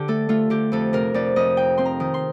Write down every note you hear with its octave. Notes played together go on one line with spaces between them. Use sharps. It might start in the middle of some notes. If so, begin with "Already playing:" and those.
Already playing: D3 G4
A3 A4
A3 F4
D3 G4
F2 A4
C3 A#4
F2 D5
F2 D#5
D#4 G5
C4 C6
A#5
D#3
C6